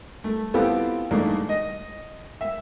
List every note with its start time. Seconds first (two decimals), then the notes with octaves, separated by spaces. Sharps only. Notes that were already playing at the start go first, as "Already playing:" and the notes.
0.24 A3
0.54 B3 C4 E4 F4 G4 A4
1.11 E2 G#2 A3 A#3 D4
1.49 D#5
2.41 E5